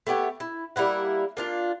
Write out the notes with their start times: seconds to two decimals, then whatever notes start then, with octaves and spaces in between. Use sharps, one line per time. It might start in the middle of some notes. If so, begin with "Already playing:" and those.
0.07 A3 B3 G4 C#5
0.40 E4
0.76 G3 A#3 E4 F#5
1.37 A#3 D4 F4